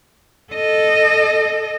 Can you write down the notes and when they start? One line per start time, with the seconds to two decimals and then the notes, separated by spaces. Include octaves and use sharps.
0.53 A4 D#5